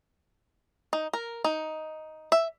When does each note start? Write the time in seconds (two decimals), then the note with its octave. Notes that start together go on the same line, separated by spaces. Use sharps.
0.93 D#4
1.13 A#4
1.44 D#4
2.32 E5